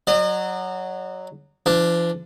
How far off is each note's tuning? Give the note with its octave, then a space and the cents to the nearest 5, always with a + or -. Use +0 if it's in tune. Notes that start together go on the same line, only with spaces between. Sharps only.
F#3 +0 D#5 -40
F3 -45 D4 +0